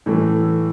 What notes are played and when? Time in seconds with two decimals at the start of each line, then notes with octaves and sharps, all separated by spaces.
0.06 A2 E3 A3